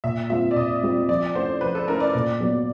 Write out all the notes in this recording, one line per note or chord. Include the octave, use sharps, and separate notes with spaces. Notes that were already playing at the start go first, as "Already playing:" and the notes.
A#2 E5
G3 C4 F4 E5
D5
A#2 D#5
G3 C4 F4
F3 D5
A3 C#4 E4 C5
F3 B4
A4
A3 C#4 E4 A#4
D5
A#2
F#3 B3